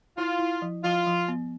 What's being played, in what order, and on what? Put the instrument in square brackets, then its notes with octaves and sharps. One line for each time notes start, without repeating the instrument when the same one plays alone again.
[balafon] E4 [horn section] F4
[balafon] E4
F3
[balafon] F3 [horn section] F4
[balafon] F3
B3